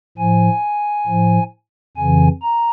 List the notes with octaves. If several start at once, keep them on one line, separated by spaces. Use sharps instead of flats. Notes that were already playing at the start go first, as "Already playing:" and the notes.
A2 F3 G#5
A2 F3
F2 C#3 E3 G#5
A#5